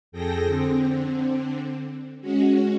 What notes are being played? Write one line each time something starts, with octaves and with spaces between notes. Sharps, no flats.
F2 G#4 A4 G5 A#6
D3 C4
G#3 C#4 F#4